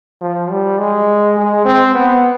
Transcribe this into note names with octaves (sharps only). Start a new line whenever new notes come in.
F3
G3
G#3
G#3
C4
B3